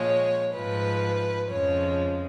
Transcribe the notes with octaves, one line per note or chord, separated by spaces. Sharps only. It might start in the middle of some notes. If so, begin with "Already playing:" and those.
Already playing: A#2 F3 G#3 C#5
G#2 F3 G#3 B4
F2 C#3 F3 G#3 C#5